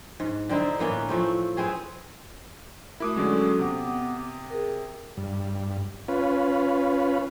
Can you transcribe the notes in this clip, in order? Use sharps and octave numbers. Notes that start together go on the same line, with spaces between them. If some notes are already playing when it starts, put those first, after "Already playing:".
G#2
D3 C4 D#4 E4
A2 E3 A#3 B3
F3 A3 C4
B3 C4 G#4
A3 E4 F#4 A#4 D6 D#6
D3 F#3 G#3 C#4 F#4 A4
C3 B3 F#5 D6
G#4 A#4
G2
C#4 F4 B4